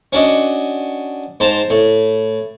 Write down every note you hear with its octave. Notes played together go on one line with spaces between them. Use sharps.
C#4 D4 F#4 D#5
G#2 C5 A5 A#5
A2